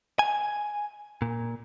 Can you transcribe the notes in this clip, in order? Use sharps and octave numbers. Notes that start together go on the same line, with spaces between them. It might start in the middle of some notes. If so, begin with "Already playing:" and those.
G#5
A#2